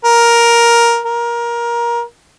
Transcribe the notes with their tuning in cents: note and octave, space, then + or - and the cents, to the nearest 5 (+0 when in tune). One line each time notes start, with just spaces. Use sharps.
A#4 +10
A#4 +20